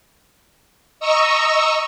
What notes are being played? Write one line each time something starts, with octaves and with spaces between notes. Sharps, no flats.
D#5 A#5 C#6 E6